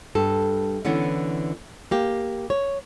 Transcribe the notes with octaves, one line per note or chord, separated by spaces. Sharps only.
G2 A4
D3 E3 B3 C#4
A#3 G4
C#5